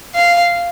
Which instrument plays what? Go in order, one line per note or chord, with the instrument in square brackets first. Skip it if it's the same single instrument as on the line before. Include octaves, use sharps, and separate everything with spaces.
[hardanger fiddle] F5